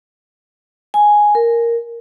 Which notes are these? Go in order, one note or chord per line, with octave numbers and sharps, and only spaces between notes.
G#5
A#4